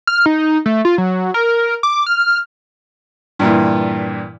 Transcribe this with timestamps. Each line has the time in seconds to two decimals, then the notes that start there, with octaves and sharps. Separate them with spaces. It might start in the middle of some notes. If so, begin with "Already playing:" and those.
0.07 F6
0.26 D#4
0.66 A3
0.85 F4
0.98 F#3
1.34 A#4
1.83 D6
2.06 F6
3.39 G2 A#2 E3